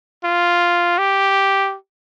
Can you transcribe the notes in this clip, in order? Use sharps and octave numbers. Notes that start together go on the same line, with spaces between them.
F4
G4